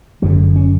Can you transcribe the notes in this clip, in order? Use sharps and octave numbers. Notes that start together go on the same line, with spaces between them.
F#1 F#2 D3 F#3
C#4